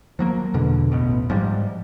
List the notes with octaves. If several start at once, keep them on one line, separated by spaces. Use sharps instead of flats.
F3 F#3 A#3
E2 B2 D3
A1 B2
G#2 F3 G3